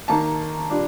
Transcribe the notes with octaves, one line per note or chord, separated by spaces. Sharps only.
D#3 A#3 D#4 A5
A#2 G3 D4